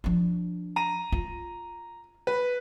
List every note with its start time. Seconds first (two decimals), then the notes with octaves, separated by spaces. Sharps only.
0.04 F3 D4
0.76 A#5 D#7
1.12 F4
2.27 B4